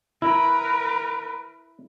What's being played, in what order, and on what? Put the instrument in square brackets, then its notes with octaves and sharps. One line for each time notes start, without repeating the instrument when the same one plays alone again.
[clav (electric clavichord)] E4 [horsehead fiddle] A#4 B4